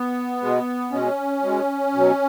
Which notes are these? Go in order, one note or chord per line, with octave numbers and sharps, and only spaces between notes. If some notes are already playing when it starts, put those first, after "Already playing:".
Already playing: B3
B2 G#3
B2 G#3 C#4
B2 G#3
B2 F#3